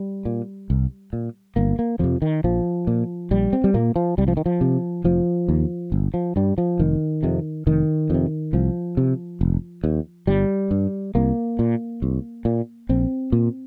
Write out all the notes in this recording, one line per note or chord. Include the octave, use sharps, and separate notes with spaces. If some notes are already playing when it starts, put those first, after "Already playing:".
Already playing: G3
A#2
C2
A#2
G1 A#3
A#3
F2 C3 F3
D#3
A#1 F3
A#2
A#1 G3
C4
G3
A#2 A#3
F3
C2 G3
F3
D#3
F3
C3
F1 F3
D#2
G1
F3
G2 G3
F3
F1 D#3
F2 C3
F1 D#3
F2 C3
C2 F3
C3
F1
D#2
G1 G3
G2
C2 A#3
A#2
C2
A#2
A#1 C4
A#2